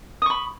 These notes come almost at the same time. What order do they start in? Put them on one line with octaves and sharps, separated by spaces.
D#6 C#6 B5